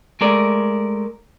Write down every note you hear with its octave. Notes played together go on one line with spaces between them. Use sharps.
G#3 A3 A#4 D5